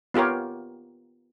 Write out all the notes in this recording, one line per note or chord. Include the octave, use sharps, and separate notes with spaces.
B3 F4 G4 A#4 C#5